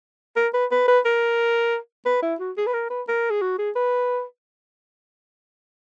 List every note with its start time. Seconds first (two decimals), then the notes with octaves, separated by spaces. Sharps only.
0.37 A#4
0.54 B4
0.71 B4
0.88 B4
1.05 A#4
2.06 B4
2.23 E4
2.40 F#4
2.57 G#4
2.67 B4
2.73 A#4
2.90 B4
3.08 A#4
3.31 G#4
3.42 F#4
3.59 G#4
3.76 B4